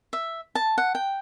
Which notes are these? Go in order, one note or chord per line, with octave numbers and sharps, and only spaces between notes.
E5
A5
F#5
G5